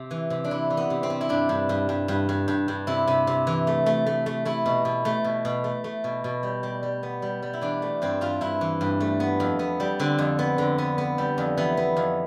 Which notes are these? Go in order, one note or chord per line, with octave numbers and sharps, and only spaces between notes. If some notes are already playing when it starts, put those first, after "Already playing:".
Already playing: C3
E3
C3
D4
E3 E4
E3
B3
C3
C4
C3
E4
G2 D4
G2
G2
G2
G2
G2
G2
G2
C3 E4
C3
C3
E3
A3
A3
A3
A3
A3 E4
B2
B2
A3
B2
B2
A3
A3
B2
B2
G3
G3
G3
B3
G3
G3
E4
E3 D4
A3
G2 C4
G2 F4
G2 E4
E3
G2
A3
B3
F2
B3
G3
D3 C4
F2
B3
D3
B3
B3
G3
F2
E3 B3
B3
F2